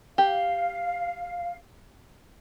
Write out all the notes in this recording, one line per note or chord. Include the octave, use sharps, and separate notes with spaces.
G4 F5